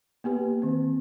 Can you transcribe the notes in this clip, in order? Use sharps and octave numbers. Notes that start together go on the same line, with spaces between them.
A#3 B3 G4 B4
D#3 C4